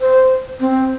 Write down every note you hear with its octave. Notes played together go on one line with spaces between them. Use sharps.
C5
C4